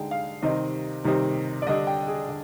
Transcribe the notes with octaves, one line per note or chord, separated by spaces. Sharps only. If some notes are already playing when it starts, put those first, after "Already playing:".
Already playing: D3 G#3 D#4 G5
F5
C3 D#3 G3 C4 D#4 D#5
C3 D#3 G3 C4 D#4
D5
D3 G3 D4 D#5
G5
G#4
D3